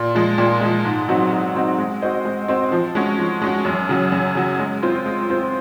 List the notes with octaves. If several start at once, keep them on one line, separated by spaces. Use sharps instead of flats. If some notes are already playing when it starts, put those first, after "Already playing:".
Already playing: A#2
F3 G#3
A#2
F3 G#3
G#2
F#3 C4 D#4 F#4
G#2
F#3 C4 D#4 F#4
G#3
C4 F#4 C5 D#5
G#3
C4 F#4 C5 D#5
F3
G#3 C#4 F#4
F3
G#3 C#4 F#4
F#2
C#3 F#3
F#2
C#3 F#3
G#3
C4 F4 C5
G#3
C4 F4 C5